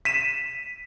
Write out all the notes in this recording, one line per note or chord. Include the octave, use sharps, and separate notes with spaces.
B6 D#7 E7